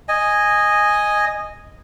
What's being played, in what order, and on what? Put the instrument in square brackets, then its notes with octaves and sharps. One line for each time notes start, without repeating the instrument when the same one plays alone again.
[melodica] D#5 G#5